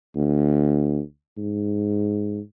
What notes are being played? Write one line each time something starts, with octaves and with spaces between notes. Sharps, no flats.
D2
G#2